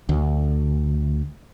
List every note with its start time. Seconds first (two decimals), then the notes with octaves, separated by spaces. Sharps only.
0.09 D2